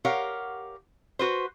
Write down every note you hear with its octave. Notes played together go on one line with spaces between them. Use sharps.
G4 A#4 C#5 F5 F#5
F#4 B4 C5